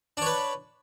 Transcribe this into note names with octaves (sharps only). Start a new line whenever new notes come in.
D4 B4 C#5